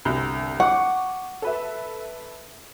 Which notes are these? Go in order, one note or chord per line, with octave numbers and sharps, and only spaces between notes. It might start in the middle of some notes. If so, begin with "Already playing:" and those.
G1 C2
F#5 C#6 D6
A4 B4 E5